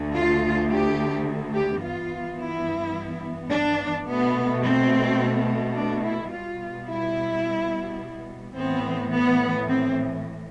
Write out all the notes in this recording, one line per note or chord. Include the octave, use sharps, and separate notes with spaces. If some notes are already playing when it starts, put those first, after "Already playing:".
Already playing: D2 D3 A3
F4
G4
G4
G2 E3 B3 F4
E4
D4
B2 A3 B3
C4
D4
E4
B2 G3 B3 F4
E4
A2 E3 B3 C4
B3
C4